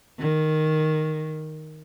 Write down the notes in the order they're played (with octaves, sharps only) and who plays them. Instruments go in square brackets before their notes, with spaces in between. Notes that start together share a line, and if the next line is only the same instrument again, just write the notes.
[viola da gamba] D#3